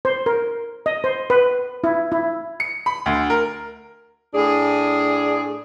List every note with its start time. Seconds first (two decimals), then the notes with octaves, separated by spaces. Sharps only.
0.05 C5
0.26 A#4
0.86 D#5
1.04 C5
1.30 B4
1.84 E4
2.12 E4
2.60 C#7
2.86 B5
3.06 D2
3.30 A#4
4.34 A2 D4 G#4